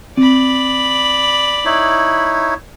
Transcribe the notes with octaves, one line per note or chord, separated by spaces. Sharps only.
C4 D5 B5
D#4 E4 C#5